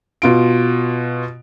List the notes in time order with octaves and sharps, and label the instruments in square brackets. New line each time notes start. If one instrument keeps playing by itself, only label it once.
[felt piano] B2 F4 D7